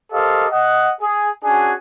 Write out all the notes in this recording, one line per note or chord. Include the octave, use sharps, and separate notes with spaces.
G4 A4 A#4 C5 D#5 F5
D#5 F#5
G#4
C#4 D4 F#4 G#4 G#5